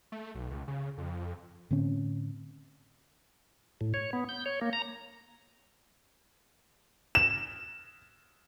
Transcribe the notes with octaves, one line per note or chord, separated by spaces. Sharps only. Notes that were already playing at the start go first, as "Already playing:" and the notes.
A3
B1
C#2
C#3
F2
A2 D3 C4 C#4
A2
C#5
B3
G6
C#5
A#3
A#5
E7